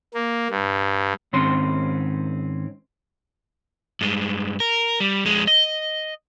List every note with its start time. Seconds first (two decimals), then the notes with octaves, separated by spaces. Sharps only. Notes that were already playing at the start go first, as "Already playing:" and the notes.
0.14 A#3
0.51 G2
1.33 G#2 D#3 C4 C#4 C6
4.01 G2 G#3
4.60 A#4
5.00 G3
5.25 F2 G#3
5.47 D#5